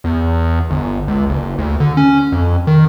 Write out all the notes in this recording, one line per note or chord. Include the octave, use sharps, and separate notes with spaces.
E2
G1
C#2
F#1
D2
D3
C#4
F2
D#3